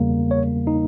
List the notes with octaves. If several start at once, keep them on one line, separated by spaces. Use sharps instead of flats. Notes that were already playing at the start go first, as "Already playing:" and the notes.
Already playing: E2 C#3 G3 A#3
C#5
D#4